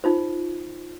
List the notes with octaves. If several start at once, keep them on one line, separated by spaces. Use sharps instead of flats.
D#4 F4 C5